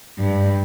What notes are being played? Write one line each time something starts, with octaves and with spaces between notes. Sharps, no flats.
G2